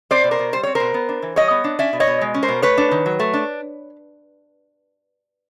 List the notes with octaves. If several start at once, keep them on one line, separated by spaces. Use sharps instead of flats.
C4 C5 D5
B2
A#4 C5
B2
G3 C5
C4 C#5
B2 A#4 C5
B3
D4
E3
G3 C#5 D#5
B3
D4
C#4 D5 E5
B2
C#5 D#5
B2
G#3
C#4
A#4 C5
B2
A3 B4 C#5
D4
D#3
F#3
A3
D4